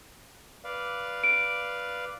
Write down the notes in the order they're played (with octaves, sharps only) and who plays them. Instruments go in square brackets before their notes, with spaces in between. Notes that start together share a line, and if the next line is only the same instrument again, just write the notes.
[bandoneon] B4 D5 F5
[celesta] D7